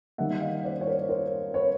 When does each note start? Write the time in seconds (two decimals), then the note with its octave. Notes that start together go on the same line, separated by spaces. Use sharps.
0.18 D#3 G3 A#3 D#4 E5 F#5
0.41 D#5 F5
0.64 C5 D5
0.81 C#5
0.87 A#4 C5
1.09 A#4 C5
1.54 B4 C#5